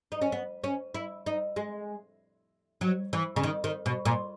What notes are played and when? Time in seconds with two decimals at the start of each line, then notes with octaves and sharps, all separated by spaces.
0.12 D#4
0.21 C#4
0.32 B3
0.64 C#4
0.95 E4
1.26 D#4
1.56 G#3
2.81 F#3
3.13 E3
3.36 C#3
3.43 D#3
3.64 D#3
3.86 B2
4.05 A#2